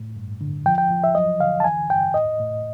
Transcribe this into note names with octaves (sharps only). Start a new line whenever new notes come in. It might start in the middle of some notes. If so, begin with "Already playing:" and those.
Already playing: A2
G2
D3
F3 G5
G5
F3
E5
F#3 D#5
D3 F5
A5
E3 G#5
G2 G5
A2 D#5
A2